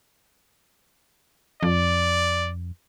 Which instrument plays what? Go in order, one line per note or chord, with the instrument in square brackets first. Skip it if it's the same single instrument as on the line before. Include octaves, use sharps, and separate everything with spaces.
[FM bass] F2 [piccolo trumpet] D5